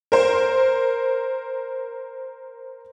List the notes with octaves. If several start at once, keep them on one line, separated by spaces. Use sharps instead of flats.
A#4 C5